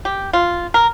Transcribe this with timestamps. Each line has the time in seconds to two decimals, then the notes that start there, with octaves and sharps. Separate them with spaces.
0.05 G4
0.33 F4
0.74 A#4